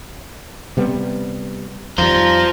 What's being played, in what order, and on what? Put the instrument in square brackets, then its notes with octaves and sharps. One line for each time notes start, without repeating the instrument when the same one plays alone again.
[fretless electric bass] C3 G3 B3
[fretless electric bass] F2 D#3 G3 [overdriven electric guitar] F4 C5 [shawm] A#5